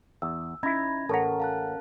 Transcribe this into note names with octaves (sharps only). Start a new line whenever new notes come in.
E2 E6
C#4 D#4 E4 B5 G#6 A#6
A1 A4 A#4 C#5 F#5 A5 A#5
F5 A5 F#6